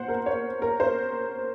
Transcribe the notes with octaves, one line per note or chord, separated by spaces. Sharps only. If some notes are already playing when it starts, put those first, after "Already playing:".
Already playing: A#2 C5 F#5
A#4
C#5
A#4
C5